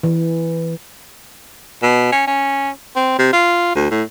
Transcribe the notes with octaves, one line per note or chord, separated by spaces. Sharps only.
E3
B2
C#4
C#4
C4
C3
F4
D2
A2